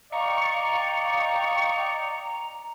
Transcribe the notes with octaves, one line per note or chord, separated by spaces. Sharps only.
D5 D#5 F5 G5 A#5 C#6